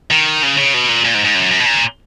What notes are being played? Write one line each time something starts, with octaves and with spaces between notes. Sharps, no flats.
D#3
C#3
C#3
B2
A#2
A#2
G#2
G#2
F#2
F#2
B2
A#2